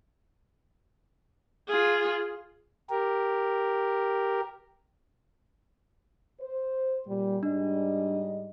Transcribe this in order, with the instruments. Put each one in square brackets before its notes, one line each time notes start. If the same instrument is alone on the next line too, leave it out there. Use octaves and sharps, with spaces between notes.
[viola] F4 G#4
[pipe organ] G4 A#4
[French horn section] C5
A#2 G3
[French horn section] G#2 G3 D#5 [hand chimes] D4